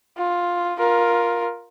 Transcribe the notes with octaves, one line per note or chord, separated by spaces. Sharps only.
F4
F4 A#4